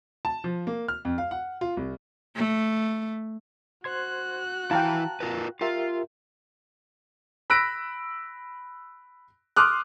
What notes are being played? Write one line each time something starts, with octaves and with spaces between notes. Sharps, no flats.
A5
F3
A#3
F6
F2
F5
F#5
F4
C2
A3
F#4 C5 C6 F#6 G#6
E3 E4 F5 G5 A5 A#5
F4 A#4 B4
F4 G4 A#4 E5
B5 E6 F#6 A#6 B6 D7
C6 D6 D#6 F6 F#6